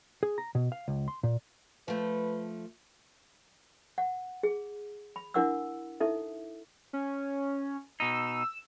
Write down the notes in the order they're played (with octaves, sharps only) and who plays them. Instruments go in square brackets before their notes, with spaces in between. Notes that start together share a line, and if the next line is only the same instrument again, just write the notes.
[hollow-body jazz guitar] G#4
A#5
B2
F5
C#2
C6
A#2
[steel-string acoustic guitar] F3 A3 [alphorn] B4
[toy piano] F#5
G#4
B5
D4 E4 A#4 F#5 D6 E6
D#4 E4 A4 E5
[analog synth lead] C#4
[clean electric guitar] B2 D#4 [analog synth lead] E6